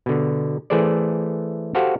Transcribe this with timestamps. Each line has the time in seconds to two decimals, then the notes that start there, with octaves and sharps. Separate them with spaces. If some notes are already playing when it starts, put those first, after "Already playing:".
0.06 B2 D3
0.70 E3 A3 G#4 A4 C5 D5
1.75 F#4 G4 A4 C5 F5 F#5